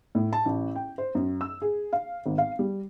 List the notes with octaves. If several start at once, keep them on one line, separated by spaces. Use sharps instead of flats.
A2
A5
A1
G5
C5
F#2
E6
G#4
F5
G#1
F5
G3